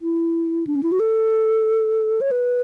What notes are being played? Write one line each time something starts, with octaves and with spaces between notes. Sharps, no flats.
E4
D4
C#4
E4
F#4
A4
C#5
B4